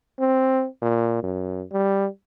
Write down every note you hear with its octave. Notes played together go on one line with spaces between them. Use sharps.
C4
A#2
F#2
G3